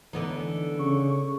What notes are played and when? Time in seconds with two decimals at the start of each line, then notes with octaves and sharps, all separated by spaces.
0.13 D3 E3 B3 D#4
0.79 C#3 C#6